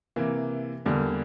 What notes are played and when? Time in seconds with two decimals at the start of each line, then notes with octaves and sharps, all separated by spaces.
0.16 C3 E3 A#3
0.85 E2 D3 G3 A#3